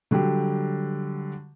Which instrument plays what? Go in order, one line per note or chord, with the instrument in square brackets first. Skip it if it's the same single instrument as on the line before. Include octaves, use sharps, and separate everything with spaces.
[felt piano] D3 F#3 G3 G4